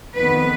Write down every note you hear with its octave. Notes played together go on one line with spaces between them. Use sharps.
F2 D#3 B3 B4